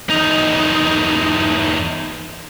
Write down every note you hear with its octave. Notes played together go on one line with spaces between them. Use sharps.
E2 D#4